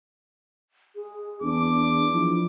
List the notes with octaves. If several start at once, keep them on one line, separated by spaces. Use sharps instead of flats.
G#4
E2 D4 D6
F3 E4